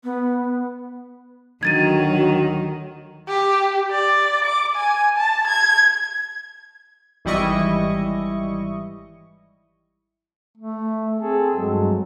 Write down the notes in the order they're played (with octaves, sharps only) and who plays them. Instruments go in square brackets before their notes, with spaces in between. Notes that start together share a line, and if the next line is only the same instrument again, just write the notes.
[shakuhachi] B3
[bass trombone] D2 [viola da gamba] D#3 [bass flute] F#3 [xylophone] G#6 A6 D#7
[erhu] G4
D5
D6
G#5
A5
G#6
[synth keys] G#1 E3 G3 E4 D#5 C#6
[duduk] A3
[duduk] C4 [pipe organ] G#4 A4
[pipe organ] G2 F#3 G#3